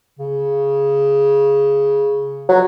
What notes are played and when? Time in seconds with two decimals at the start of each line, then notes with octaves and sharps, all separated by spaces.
0.19 C#3
2.49 F#3